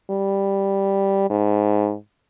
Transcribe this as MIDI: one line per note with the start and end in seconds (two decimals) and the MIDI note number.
0.11 1.25 55
1.30 1.94 44